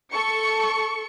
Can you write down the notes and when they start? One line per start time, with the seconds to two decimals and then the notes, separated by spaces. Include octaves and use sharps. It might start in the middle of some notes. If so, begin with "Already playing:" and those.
0.12 A4 C#6 C#7